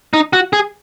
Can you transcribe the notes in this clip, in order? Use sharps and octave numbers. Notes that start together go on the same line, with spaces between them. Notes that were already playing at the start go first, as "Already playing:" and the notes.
D#4
F#4
G#4